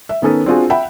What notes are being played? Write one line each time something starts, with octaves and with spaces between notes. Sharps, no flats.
E5
D#3 B3 C#4 A4 B4
C4 D4 F4 F#4 G#4
E5 F#5 G5 B5